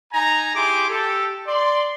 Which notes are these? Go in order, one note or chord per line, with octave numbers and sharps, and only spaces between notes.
D#4 G#5 A#5
E4 G4 G#4 C6 D6
G4 A4
D5 C6